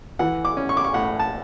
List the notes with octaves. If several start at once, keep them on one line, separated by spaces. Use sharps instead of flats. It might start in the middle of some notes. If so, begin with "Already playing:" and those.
E3 F#5
D6
C#4
C#6
D6
C#6
A2 F#5
A5